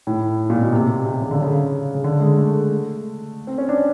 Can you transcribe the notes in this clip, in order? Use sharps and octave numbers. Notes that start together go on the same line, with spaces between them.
A2
A#2
B2
C3
C3
C#3
D3
C#3
C#3
D3
G#3
A3
C4
C#4
D4